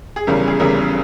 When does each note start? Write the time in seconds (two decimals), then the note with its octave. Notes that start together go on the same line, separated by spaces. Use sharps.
0.16 G#4
0.27 F1 E2 C#3 G3 A#4
0.47 G#4
0.59 F1 E2 C#3 G3 A#4